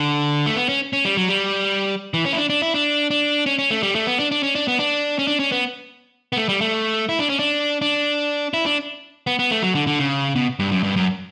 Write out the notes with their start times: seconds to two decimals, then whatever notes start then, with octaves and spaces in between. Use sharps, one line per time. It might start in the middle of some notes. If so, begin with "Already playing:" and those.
Already playing: D3
0.46 A3
0.56 B3
0.69 C#4
0.93 C#4
1.05 G3
1.17 F#3
1.29 G3
2.14 E3
2.26 C#4
2.32 E4
2.37 D4
2.50 D4
2.62 E4
2.74 D4
3.11 D4
3.46 C#4
3.59 C#4
3.71 A3
3.83 G3
3.95 A3
4.07 B3
4.19 D4
4.31 D4
4.43 C#4
4.55 D4
4.68 B3
4.79 D4
5.19 C#4
5.27 D4
5.39 C#4
5.52 B3
6.33 B3
6.37 A3
6.49 G3
6.61 A3
7.09 E4
7.20 D4
7.29 C#4
7.39 D4
7.82 D4
8.54 E4
8.66 D4
9.27 B3
9.39 B3
9.51 A3
9.62 F#3
9.75 D3
9.87 D3
9.99 C#3
10.36 B2
10.59 G2
10.72 F#2
10.83 G2
10.96 F#2